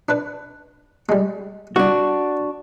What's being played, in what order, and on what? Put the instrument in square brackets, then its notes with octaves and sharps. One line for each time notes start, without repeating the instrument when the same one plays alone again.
[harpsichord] D4 B4
G3 G#3
[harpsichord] C2 [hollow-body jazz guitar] D4 F#4